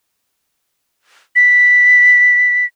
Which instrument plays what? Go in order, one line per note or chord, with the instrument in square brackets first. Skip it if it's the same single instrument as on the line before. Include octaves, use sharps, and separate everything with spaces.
[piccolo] B6